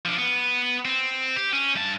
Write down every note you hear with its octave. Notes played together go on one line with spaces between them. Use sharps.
F3 D4
B3
C4
G4
C#4
G2 A5